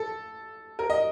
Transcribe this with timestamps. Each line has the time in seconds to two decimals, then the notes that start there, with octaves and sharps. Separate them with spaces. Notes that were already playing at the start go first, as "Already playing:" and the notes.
Already playing: A4
0.79 A#4
0.90 D#5